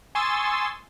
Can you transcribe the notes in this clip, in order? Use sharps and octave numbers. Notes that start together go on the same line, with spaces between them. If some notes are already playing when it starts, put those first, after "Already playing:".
G#5 C6 C#6 D#6 E6 A6